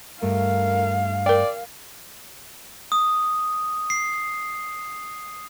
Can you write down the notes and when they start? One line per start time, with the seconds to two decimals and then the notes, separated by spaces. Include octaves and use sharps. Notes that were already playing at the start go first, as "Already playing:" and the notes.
0.23 G2 A3 A#4 F5
1.26 A#4 D5 G5
2.92 D#6
3.90 C7